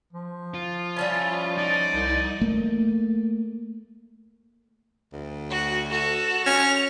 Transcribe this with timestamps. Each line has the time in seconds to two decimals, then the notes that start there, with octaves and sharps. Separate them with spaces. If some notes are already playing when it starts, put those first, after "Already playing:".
0.13 F3
0.54 F4
0.97 G3 C#4 E4 A5
1.58 D#4 D5
1.94 C2
2.41 A3 A#3
5.13 D2
5.50 F#4
5.90 F#4 A4
6.46 C#4 F7